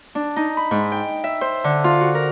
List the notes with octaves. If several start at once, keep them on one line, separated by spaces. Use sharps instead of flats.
D4
D#4
B5
G#2
G5
E5
C5
D3
F4
F#4
A#4